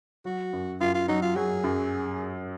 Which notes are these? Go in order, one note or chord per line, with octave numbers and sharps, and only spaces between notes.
F#3 F#4
F#2
F#2 F4
F4
F#3 D#4
F4
F#3 G#4
F#2